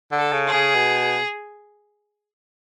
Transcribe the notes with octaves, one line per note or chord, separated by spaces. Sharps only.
D3
A4
C#3
G#4
C#3
B2